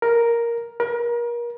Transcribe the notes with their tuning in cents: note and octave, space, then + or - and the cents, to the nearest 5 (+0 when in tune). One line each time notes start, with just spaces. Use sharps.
A#4 +5
A#4 +35